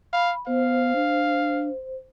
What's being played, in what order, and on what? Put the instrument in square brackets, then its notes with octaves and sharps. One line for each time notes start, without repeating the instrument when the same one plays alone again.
[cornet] F5 [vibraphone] B5
[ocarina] B3 [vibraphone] C5 [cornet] F5
[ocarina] D4